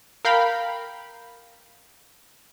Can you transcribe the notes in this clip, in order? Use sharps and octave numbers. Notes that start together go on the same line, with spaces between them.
A#4 F5 G5 B5